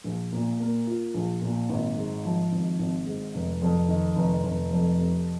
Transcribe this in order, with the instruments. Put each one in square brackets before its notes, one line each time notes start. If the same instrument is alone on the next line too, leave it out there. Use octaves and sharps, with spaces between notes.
[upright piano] A#1
A#2
A#3
F4
A#1
A#2
G#1
G#2
F3
G#1
G#1
G#2
F1
F2
D#3
F1
F1
F2
C3